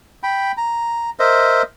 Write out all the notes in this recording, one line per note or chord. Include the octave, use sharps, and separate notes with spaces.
G5 B5
A#5
A#4 C5 D#5 E5